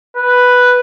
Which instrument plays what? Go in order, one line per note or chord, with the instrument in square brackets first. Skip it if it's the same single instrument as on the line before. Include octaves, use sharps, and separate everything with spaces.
[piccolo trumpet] B4